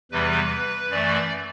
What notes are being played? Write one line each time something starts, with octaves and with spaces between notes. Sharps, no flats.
E2 C3 E3 G3 B4
F#2 E3 A3 D5